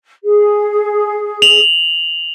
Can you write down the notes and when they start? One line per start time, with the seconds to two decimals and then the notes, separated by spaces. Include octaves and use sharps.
0.23 G#4
1.42 F7 F#7